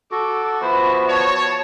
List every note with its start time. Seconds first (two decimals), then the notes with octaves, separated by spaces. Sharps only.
0.11 F#4 A4 D6
0.62 F3 B3 E4 C5
1.08 C#5 A5